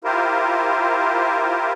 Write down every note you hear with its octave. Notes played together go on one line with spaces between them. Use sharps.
E4 F4 G4 A#4 C5